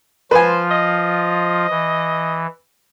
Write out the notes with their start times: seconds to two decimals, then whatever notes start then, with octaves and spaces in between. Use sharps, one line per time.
0.31 F3 F4 B4 C5 G#5
0.71 D#5
1.70 E3